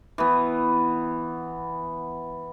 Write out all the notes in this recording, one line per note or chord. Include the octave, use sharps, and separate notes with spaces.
E3 B3